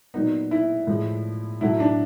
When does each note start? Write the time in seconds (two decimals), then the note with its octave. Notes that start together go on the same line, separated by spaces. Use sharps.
0.14 A#2 F#3 B3 D#4
0.51 E4
0.87 A2 F3 G#3
1.61 A2 F#3 A3 E4
1.80 D4